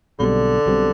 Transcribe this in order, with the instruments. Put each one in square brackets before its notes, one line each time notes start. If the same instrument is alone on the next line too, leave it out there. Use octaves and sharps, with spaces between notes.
[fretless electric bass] B1 B2 G3 C4 [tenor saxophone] D3
[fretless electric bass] B1 B2 G3 C4